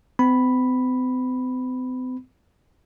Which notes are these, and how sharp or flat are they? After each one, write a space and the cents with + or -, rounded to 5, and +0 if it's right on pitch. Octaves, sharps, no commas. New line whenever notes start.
C4 -45 B5 +0